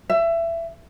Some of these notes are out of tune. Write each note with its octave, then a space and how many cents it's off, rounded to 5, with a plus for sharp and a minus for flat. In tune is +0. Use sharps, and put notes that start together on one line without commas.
E5 +20